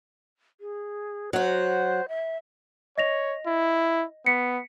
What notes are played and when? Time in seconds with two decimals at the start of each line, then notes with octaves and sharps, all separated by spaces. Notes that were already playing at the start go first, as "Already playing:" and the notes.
0.61 G#4
1.33 F#3 F#4 C5
2.08 E5
2.98 C#5 D#5 A#6 F7
3.46 E4
4.26 B3 B6 C#7